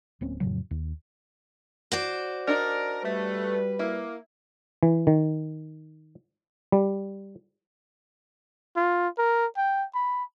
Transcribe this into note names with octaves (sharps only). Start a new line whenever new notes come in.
D1 A#3 C4 C#4
F2 A2 C#3 F#3
D#2
F#4 C5 D5
D4 D#4 A#4
G3 A3 B4
A#3 E4
E3
D#3
G3
F4
A#4
G5
B5